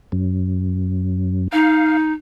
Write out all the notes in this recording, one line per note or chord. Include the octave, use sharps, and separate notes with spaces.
F#2
D#4 F5